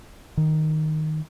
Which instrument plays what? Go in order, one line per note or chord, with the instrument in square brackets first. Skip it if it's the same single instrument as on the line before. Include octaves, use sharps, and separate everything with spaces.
[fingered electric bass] D#3